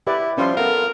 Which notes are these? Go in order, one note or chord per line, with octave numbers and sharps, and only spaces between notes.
E4 G4 B4 D5
F3 G3 C#4 F4 B4 E5 C6
B3 A4 A#4 F5